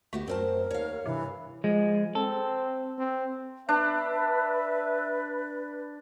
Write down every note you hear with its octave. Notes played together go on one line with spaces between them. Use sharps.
D2 A3 B3 F#4 G4
F#2 C4 A#4 C5 A5
D#2 C#5 F5
G2 C3 E3
F3 G#3
C4 A4
C4
D4 B4 E5